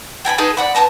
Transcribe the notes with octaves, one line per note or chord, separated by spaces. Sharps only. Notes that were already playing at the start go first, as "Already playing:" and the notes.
G5 G#5 A#5 B5
D#4 G#4 A4 B4
D5 F#5 B5
B3 E4 A5 A#5